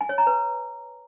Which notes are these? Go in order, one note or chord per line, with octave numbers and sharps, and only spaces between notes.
G#5
C#5
A#5
B4